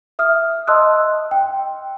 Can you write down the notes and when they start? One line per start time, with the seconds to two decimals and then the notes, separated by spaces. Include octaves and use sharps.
0.19 E5 D#6 F6
0.67 D#5 A5 C6 D#6 E6 F#6
1.31 G5